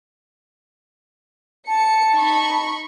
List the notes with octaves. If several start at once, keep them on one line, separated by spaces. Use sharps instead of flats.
A5 C#7
D#4 B5 C#6